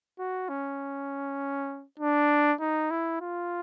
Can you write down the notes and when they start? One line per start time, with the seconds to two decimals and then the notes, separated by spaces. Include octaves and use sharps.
0.19 F#4
0.49 C#4
1.99 D4
2.61 D#4
2.91 E4
3.21 F4